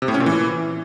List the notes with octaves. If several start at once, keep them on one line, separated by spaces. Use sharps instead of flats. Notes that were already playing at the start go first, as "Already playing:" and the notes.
C3
A2
C#4
A#2
E3